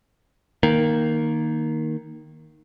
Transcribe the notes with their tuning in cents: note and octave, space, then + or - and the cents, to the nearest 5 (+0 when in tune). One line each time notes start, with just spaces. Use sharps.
D#3 +0 A#3 +0